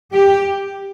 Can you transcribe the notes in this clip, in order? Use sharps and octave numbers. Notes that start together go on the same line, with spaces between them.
G4